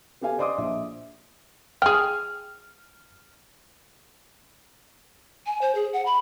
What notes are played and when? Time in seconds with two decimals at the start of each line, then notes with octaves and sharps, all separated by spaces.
0.21 B3 G4 A4 F5 G#5
0.38 C5 D5 D#5 C6 D6 D#6
0.58 A#1 E5
1.82 G#4 G5 F6
5.46 G#5
5.62 C5
5.75 G#4
5.93 F#5
6.06 B5